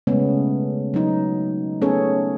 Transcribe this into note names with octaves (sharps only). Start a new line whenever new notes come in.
C#3 G#3 A3 B3 C#4
F#3 D#4
A3 B3 C#4 G#4 A4 C#5